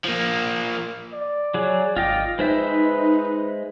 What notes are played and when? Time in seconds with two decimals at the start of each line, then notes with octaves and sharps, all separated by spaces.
0.04 F3 A#3
1.13 D5
1.54 F#3 G#4
1.96 G#1 F4 D#5 G5 D6
2.39 G#3 D#4 B4 C5 E5